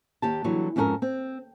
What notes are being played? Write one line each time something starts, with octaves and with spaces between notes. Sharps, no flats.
D#2 G4 A5
D3 E3 F#3 G3
F2 G#2 C#4 F#4 A4 A#4
C4